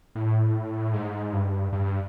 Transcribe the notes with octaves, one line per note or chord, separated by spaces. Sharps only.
A2
G#2
G2
G2